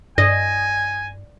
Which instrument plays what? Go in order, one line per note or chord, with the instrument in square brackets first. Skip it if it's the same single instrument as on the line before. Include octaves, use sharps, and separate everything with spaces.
[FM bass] G2 [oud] D#5 [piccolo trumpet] G#5 [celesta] A#6